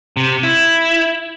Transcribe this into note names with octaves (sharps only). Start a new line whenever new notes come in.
C3
E4